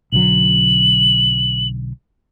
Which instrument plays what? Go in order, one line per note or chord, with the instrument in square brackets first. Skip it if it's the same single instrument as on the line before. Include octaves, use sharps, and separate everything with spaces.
[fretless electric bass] B1 D3 F#3 [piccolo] F#7